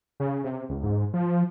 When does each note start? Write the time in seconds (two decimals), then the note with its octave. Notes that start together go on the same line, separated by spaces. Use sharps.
0.20 C#3
0.44 C3
0.69 C#2
0.83 G#2
1.14 F3